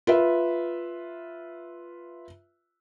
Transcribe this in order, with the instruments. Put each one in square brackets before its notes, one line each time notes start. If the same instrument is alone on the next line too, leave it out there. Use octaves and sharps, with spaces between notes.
[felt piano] F4 B4 E5